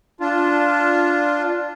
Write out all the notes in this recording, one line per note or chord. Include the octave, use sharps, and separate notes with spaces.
D4 F4